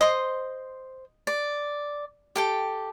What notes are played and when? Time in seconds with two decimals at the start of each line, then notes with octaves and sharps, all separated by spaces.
0.01 C5 D#5 C6
1.27 D5
2.36 G4 A4 G5